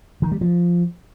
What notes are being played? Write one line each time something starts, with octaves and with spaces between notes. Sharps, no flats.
D#3
G3
F3